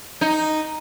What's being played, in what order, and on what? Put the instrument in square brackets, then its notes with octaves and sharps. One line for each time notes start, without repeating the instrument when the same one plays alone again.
[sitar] D#4